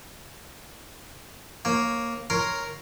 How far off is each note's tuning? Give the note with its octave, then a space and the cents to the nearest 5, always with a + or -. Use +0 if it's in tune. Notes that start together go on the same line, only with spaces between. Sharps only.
A#3 +0 C#5 -25
A#4 +0 C#5 +0 C6 +0